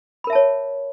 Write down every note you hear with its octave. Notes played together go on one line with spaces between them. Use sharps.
A#4 C#5 E5 A5 B5